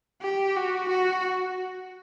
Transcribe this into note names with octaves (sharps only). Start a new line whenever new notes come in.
G4
F#4
F#4